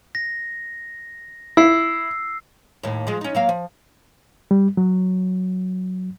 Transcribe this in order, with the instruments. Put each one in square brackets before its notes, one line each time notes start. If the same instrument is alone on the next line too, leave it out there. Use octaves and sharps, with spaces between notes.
[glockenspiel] A#6
[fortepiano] E4 [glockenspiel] E6 C7
[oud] D#2 A2
F3 G#3
C#4 D#4
F#3 A#3 F5
F3
[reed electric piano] G3
F#3